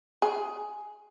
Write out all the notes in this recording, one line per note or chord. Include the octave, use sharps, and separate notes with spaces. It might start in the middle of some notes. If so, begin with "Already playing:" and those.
G#4